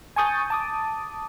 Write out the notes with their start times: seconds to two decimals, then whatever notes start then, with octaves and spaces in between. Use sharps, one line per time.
0.16 G#5 A5 C#6 D#6 G6 A6
0.50 A5 D6 D#6